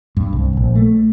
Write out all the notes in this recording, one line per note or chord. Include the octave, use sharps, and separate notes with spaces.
G2
C2
A#1
A3